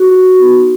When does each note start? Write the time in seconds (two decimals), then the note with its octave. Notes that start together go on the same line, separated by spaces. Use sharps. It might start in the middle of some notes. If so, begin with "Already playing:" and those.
Already playing: F#4
0.39 B3 D#4 F#4